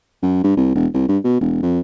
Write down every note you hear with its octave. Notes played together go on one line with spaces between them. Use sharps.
F#2
G2
C2
E1
C2
G2
B2
E1
F2